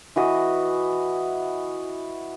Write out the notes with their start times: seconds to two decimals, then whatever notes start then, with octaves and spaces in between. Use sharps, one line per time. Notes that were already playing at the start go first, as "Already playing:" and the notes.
0.16 E3 F#4 D#5